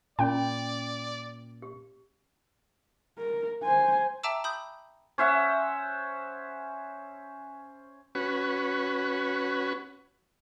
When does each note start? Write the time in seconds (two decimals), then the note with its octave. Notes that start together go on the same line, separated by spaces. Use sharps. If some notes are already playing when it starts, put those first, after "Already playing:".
0.19 A#2 C#4 F4 D5 G5 C6
1.62 G4
3.18 A#4
3.64 C5 G#5
4.23 E5 G5 A5 A#5 D6 E6
4.44 B5 D#6 G6
5.18 C#4 C5 E5 F#5
8.15 C#4 F#4 B4